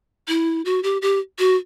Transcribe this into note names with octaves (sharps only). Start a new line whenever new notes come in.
E4
F#4
G4
G4
F#4